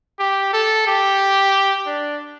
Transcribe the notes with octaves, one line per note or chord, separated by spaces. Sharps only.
G4
A4
G4
D4